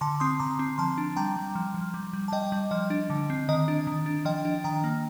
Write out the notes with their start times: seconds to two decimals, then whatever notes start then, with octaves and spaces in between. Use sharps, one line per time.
0.01 D3 A5 C6
0.20 C4 C6 D#6
0.40 D3 A#5 D6
0.59 C4
0.78 F3 A5 C6
0.98 D4
1.16 G3 G5 A#5
1.37 G3
1.55 F3
1.74 F3
1.94 G3
2.13 G3
2.28 A5
2.32 G3 D#5 G5
2.52 G3
2.71 F3 D#5
2.90 D4
3.10 D3
3.30 C4
3.49 D#3 D#5
3.68 D4
3.87 D#3
4.06 D4
4.25 F3 D#5 G5
4.45 D4
4.64 D#3 G5 A#5
4.84 A#3